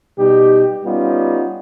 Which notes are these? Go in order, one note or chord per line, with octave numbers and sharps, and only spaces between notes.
B2 G3 D#4 G4
G3 B3 C#4 D#4 F4